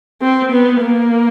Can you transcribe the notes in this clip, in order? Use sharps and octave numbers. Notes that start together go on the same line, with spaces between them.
C4
B3
A#3